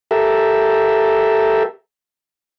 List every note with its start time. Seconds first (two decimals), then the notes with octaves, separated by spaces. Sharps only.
0.11 G4 A4 A#4 E5